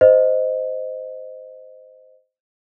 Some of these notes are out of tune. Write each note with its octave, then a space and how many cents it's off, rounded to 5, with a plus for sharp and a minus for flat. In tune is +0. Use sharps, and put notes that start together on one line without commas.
C5 -15 D#5 +0